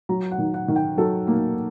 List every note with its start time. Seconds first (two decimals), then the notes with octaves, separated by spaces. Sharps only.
0.09 F#3 A#5
0.31 F#5
0.38 D#3
0.54 F#5
0.68 D#3
0.76 G5
0.97 F#3 A4
1.27 A#3